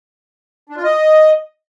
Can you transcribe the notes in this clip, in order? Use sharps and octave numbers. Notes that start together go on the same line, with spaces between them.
D4
F4
D#5